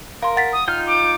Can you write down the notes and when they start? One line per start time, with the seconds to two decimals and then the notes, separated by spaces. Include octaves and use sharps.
0.22 A#4 F5 C6
0.36 F#5 A6 B6
0.53 D#6
0.68 D#4 F4 G5 F6
0.87 D6